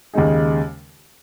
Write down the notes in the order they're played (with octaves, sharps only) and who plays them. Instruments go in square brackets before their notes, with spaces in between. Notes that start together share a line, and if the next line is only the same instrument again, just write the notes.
[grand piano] D#2 C#3 G#3 D#4 G#4